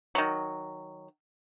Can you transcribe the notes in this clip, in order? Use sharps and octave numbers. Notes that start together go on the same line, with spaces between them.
D#3 F#3